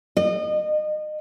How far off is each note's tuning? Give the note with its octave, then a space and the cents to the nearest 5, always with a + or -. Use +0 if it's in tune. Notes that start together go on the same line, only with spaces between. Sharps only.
D#5 -30